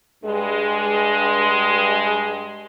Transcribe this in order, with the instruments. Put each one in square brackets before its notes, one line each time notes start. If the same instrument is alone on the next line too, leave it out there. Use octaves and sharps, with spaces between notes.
[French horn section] G2 G#3